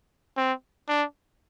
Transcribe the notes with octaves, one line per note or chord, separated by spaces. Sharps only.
C4
D4